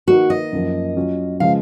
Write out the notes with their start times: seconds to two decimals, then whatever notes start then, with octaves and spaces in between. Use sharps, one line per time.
0.07 D#3 A#3 D#4 F#4 A#4
0.30 D#5
0.53 F#2 F3 A#3
0.96 F#3 C#4 F4
1.40 C#3 F3 G#3 F5